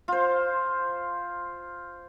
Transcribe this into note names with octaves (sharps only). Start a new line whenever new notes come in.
F4 C5